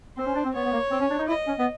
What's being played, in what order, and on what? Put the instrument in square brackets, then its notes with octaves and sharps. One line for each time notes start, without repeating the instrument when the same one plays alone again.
[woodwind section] C4 [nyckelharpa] C5
[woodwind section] C#4
D4
C4
[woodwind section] B3 [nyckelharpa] C#5
[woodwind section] B3
A#3
C4
C#4
D4
D#4
[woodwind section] E4 [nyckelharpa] D#5
[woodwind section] C#4
B3